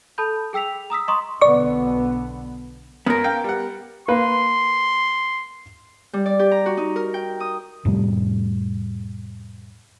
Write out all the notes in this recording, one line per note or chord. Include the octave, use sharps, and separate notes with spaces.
A4 A5 B5 G6
G#4 G5 E6 B6 F7
A#5 D#6 E6 B6
D#5 A#5 C6 C#6 D#6
B1 D3 B3 D5 C#6
F#2 B3 A#4 D#6
F5 G5
G3 F#5
A#3 B4 C6
G3
D5
G4
A#5
F#4
D#4
A#4
G5
D#6
F2 A2 C3 G3